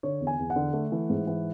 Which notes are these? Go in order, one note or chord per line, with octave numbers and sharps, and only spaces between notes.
D3 C#5
E2
G#5
E2
F#5
D3
A3
E3
G#2
E3